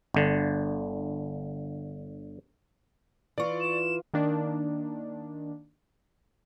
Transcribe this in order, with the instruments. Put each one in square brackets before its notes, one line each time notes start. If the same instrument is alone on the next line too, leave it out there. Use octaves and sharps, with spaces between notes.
[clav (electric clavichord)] G1 D3
[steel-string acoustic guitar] E3 F4 [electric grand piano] D5 C#6
[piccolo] E7
[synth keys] D#3 A#3 D4